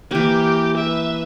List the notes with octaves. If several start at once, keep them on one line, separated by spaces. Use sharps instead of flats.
E3 A#3 G4
B4 E5